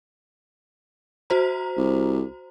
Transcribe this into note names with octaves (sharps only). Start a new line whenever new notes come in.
F#4 C5 A#5
C2